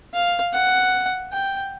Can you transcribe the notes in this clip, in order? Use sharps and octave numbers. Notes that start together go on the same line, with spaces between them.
F5
F#5
G5